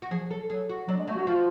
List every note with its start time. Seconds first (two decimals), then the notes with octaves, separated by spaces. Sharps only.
0.02 F#4
0.11 F3 G#4
0.31 F#3 A4
0.50 F#3 G#4
0.69 F#4
0.88 F#3 D4
0.98 G#3
1.07 F#3 A3
1.17 F#4
1.27 F3 F4